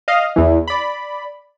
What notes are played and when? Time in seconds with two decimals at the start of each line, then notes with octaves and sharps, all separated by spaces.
0.08 D#5 F5
0.36 E2 E3
0.68 D5 B5